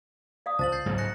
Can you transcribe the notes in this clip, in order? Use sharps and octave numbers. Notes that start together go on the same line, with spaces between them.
D5 F5 D#6
C#2 C5 F5 A5 A6 F#7
G6 A6 C7
G#2 C#3 F#3
F#6 A#6 C#7